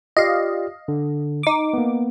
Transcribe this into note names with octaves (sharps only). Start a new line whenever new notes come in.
F4 G4 D5 D#5 F5
D3
D#4 D6
A#3 B3